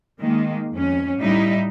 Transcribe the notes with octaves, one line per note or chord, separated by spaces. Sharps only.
D#3 G#3 A#3
F2 C#4
A2 G3 D#4 E4